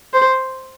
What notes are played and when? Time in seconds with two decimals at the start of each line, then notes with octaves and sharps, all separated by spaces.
0.13 C5